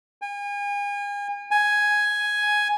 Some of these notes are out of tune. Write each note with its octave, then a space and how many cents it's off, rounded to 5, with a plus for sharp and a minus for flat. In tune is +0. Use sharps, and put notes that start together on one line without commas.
G#5 -40
G#5 +5